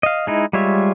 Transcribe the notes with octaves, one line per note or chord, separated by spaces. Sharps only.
D#5 F5
G#3 D#4 E4
G3 G#3 F4 C#5 E5